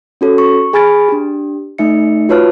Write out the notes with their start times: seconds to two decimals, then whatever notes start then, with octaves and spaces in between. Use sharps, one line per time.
0.21 C#4 F#4 A4 C#5
0.38 C#6
0.73 G#4 G#5 B5 F6 A6 D7
1.08 D4 G4
1.78 A3 D#4 E5 C#7
2.29 F4 F#4 B4 C#5 A5 F6